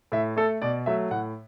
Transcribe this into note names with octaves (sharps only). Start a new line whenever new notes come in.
A2 E5
A3 A4
B2 D5
F#3 A3 E5
A2 F#5